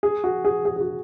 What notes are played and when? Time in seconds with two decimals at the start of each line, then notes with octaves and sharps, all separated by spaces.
0.03 G#4
0.24 F#4
0.45 G#4
0.65 G#4
0.76 G#4
0.81 F#4